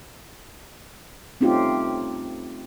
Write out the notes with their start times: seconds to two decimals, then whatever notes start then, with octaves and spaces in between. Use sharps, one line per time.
1.41 A3 C4 C#4 D#4 F4 G4